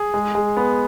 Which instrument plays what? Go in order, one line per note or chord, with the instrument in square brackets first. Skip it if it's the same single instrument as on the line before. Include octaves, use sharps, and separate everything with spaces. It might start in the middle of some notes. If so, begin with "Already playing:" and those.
Already playing: [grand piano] G#4
G#3
G#3
B3